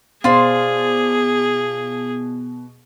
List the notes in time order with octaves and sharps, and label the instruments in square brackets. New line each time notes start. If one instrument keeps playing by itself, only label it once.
[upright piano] B2 [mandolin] F4 C5 D5 [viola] G#4